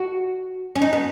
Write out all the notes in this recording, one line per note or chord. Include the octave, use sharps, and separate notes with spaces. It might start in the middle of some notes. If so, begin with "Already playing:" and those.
Already playing: F#4
C#4
D#4
B3